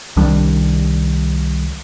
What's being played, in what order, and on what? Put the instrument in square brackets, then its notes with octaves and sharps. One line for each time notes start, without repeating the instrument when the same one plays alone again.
[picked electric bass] C2 D#3 G3 D4